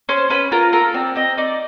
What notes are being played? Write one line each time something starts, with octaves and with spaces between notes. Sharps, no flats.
C#4 C5
C#4 B4
F4 A#4
A4 A#4
C4 D5
C4 D#5
D#4 D5